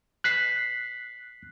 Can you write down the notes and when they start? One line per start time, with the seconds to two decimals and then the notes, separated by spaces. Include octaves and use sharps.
0.24 F#6 B6 C7